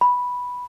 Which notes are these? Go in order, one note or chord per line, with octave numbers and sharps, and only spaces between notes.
B5